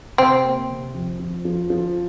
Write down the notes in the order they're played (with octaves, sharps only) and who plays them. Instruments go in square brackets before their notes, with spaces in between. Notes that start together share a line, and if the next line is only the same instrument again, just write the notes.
[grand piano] C3 [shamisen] C4
[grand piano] A#3
C3
F2
F2
F3
F3